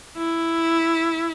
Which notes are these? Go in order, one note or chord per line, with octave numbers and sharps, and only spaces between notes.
E4